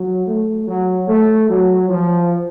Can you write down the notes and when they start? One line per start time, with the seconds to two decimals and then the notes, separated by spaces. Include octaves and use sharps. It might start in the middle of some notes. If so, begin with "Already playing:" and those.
Already playing: F#3
0.26 A3
0.66 F#3
1.07 A3
1.49 F#3
1.90 F3